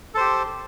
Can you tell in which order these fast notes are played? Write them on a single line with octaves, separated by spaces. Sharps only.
A4 C5 G4